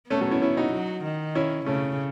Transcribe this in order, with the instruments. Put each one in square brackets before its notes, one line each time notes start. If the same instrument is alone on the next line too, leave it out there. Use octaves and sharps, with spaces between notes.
[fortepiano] A3 C#4 [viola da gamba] B3
[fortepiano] F#3 A3
C#4 E4
C#4 E4
D#4 F#4
[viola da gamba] F#3
D#3
[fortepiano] C#4 E4
[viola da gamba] C#3 [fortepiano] A3 C#4